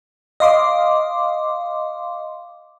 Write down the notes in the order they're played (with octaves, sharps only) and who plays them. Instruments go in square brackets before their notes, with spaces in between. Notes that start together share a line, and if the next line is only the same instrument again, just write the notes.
[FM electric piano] D#5 F5 C6 D6